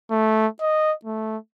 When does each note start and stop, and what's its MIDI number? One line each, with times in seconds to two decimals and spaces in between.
0.11 0.47 57
0.60 0.93 75
1.05 1.37 57